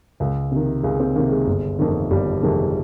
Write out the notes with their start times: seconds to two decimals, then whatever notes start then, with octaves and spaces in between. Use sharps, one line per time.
0.20 C#2
0.52 C3 D#3
0.83 C#2 G#3
1.00 C4
1.15 C3 D#3 A#3
1.31 G#3
1.47 G1
1.79 F2 C3 D#3
2.11 G1 G3
2.42 F2 C3 D#3 G#3